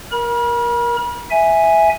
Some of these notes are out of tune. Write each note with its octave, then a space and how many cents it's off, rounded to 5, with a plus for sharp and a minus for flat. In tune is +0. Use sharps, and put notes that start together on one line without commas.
A#4 +15 B5 -40
E5 -5 G#5 +0